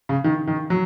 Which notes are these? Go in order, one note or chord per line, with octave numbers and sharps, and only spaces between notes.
C#3
D#3
D#3
F#3